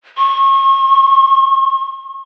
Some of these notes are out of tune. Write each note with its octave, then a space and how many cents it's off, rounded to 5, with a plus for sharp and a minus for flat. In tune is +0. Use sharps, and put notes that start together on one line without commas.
C#6 -35